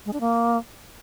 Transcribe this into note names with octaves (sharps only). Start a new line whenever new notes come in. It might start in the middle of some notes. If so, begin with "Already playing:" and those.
G#3
D4
A#3